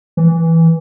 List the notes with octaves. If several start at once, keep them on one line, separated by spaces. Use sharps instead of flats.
E3